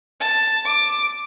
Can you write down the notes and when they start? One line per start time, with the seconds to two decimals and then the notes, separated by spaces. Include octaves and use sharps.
0.20 A5
0.66 D6